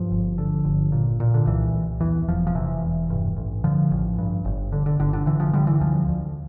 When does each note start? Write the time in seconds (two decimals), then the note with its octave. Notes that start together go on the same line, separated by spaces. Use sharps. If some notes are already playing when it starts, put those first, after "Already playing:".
Already playing: G2 F3
0.11 G1
0.38 D3
0.65 G1
0.92 A#2
1.20 A#2
1.34 D3
1.46 C2 E3
1.74 C2
2.01 E2 E3
2.28 E1 F3
2.47 F3
2.55 C3 E3
2.82 E1
3.10 G2
3.37 A1
3.64 D3 F3
3.91 A1
4.18 G2
4.45 G1
4.72 D3
4.86 D3
4.99 G1 D3
5.13 D3
5.26 D3 E3
5.40 F3
5.53 D3 G3
5.67 E3
5.81 D2 F3
6.09 D2